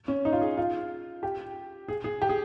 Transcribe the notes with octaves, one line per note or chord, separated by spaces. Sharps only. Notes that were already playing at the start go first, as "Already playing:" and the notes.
C#4
D#4
F4
G#4
F4
G4
G#4
G#4
G4
G#4